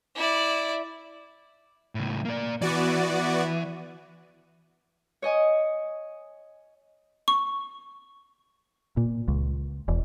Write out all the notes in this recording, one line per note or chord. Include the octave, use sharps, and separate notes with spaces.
E4 D5
C#2 A2
A#3 D5
E3 B3 F#4 D5
C#5 D#5 G#5 D#6
C#6
A#2
C#2
E1